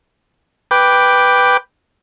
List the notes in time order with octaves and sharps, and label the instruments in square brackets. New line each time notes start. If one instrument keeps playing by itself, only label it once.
[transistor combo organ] B4 G5 D6